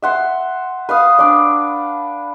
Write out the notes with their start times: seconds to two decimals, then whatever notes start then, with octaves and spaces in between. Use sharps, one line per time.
0.02 E5 F#5 C6
0.89 B4 F5 D#6
1.19 D4 D5